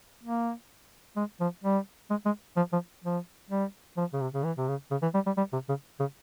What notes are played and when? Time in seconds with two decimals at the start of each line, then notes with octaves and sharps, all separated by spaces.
0.23 A#3
1.16 G#3
1.40 F3
1.64 G3
2.10 G#3
2.25 G#3
2.57 F3
2.73 F3
3.04 F3
3.50 G3
3.97 F3
4.13 C#3
4.21 C3
4.34 C#3
4.44 E3
4.57 C3
4.68 C#3
4.91 C#3
5.02 E3
5.14 G3
5.26 G3
5.37 G3
5.53 C3
5.69 C#3
6.00 C#3